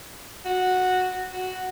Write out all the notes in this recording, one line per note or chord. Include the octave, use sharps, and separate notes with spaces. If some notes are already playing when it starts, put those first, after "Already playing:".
F#4
F#4